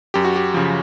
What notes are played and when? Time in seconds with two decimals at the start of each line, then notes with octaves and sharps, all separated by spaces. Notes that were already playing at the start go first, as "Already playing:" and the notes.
0.14 F#2 G4
0.25 F#4
0.36 G4
0.54 C#3 F3